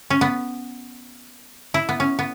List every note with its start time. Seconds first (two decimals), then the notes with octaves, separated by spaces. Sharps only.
0.10 C#4
0.21 B3
1.74 E4
1.89 B3
2.00 C#4
2.19 B3